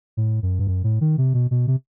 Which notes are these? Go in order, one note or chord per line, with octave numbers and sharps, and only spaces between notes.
A2
F#2
G2
F#2
A2
D#3
C3
B2
B2
C3